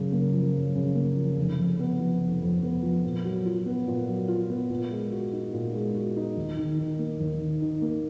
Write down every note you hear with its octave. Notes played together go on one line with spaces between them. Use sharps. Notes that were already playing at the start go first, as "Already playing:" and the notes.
Already playing: F#2 C#3
A#3
F3
F#2
C#3
A#3
F3
F1
F2
B3
F3
F1
F2
B3
F3
A#2
F#3
F4
B3
A#2
F#3
F4
B3
A#2
G#3
F#4
D#4
A#2
G#3
F#4
D#4
D#2
D#3
D#4
A#3
D#2
D#3
D#4
A#3